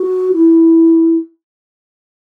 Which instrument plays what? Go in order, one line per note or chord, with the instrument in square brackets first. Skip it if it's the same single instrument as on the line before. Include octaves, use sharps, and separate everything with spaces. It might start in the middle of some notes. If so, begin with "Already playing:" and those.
Already playing: [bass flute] F#4
E4